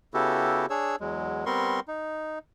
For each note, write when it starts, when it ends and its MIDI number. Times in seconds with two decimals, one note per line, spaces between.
0.14 0.66 49
0.14 0.66 59
0.14 0.66 64
0.14 0.66 66
0.14 0.66 67
0.14 0.66 69
0.70 0.96 62
0.70 0.96 68
0.70 0.96 73
0.70 0.96 88
1.00 1.45 40
1.00 1.45 54
1.00 1.45 56
1.46 1.80 55
1.46 1.80 59
1.46 1.80 60
1.46 1.80 70
1.46 1.80 84
1.46 1.80 85
1.88 2.39 63